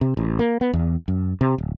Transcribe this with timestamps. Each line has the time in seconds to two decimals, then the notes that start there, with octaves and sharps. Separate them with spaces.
0.01 C3
0.17 A1
0.39 A#3
0.61 B3
0.73 E2
1.08 F#2
1.41 C3
1.58 D1